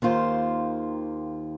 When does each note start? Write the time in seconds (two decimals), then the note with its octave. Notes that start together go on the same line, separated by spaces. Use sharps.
0.02 D#2 D#3 A#3 F4 C5